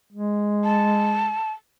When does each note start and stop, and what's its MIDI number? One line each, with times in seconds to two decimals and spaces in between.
0.13 1.35 56
0.64 1.52 81